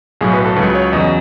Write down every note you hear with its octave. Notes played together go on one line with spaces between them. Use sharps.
B1 A2 F#3 G#4
B4
A4
C#2 C#3 F#3 B4
C#5
E2 C#3 F#3 D#5